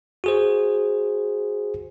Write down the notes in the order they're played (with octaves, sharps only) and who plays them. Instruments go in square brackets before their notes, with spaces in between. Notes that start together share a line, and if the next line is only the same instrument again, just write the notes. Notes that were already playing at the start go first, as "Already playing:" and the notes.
[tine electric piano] F#4 G#4 C5